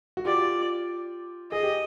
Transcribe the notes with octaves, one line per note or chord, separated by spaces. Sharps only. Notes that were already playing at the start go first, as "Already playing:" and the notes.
F#4
F4 G4 D5
G#4 D#5
G4